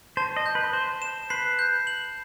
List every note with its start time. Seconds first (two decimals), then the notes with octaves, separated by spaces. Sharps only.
0.17 C5 A5
0.37 D#5
0.46 G6
0.55 B4
0.73 C5 G7
1.02 E7
1.30 B4 C7
1.59 G6
1.87 F#7